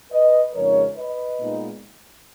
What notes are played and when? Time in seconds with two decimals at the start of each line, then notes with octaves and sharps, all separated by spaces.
0.11 B4 D#5
0.53 F2 C#3 F3 G#3 D#4 A#4 C#5
0.96 B4 D#5
1.39 A#2 G#3 B3 D#4